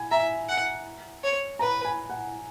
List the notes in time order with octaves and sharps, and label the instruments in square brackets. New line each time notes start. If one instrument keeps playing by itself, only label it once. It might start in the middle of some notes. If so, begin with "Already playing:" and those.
Already playing: [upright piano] G#5 B5
[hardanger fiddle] E5 [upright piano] A#5
[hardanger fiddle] F#5
C#5
[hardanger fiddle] B4 [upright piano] A#5
[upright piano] G#5
F#5